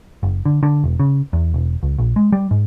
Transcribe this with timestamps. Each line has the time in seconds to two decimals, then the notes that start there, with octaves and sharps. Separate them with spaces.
0.23 F#1
0.45 D3
0.63 D3
0.84 E1
1.00 C#3
1.33 E2
1.54 E1
1.83 C#2
1.98 A#1
2.16 G#3
2.32 G3
2.51 G#2